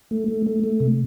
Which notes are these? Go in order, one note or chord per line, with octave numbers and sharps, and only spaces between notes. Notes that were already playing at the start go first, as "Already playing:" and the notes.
A3
A3
A3
A3
C3